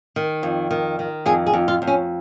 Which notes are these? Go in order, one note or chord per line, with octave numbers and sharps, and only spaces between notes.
D#3
F2
D#3
D#3
F2 G#4
G#4
F2
F4
F2
C#4